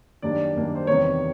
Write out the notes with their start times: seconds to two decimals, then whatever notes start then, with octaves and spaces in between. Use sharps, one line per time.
0.22 F#2 D#3 G3 A#3 D4 D5
0.55 F#2 D#3 G3 A#3 D4
0.75 C5
0.87 E2 C3 D#3 G3 B3 C#5